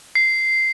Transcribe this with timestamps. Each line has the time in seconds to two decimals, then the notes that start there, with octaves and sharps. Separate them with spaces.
0.15 C7